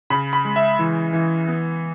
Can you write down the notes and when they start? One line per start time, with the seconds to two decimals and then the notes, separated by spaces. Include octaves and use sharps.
0.10 C#3 B5
0.33 B5
0.45 G#3
0.56 E5
0.79 E3
1.13 E3
1.48 B3